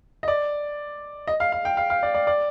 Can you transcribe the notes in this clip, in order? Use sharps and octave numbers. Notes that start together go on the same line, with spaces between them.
D#5
D5
D#5
F5
F5
G5
F5
F5
D5
D5
D5